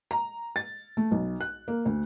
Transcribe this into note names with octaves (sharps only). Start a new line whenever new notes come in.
A#5
A6
A3
B1
F#6
A#3
D2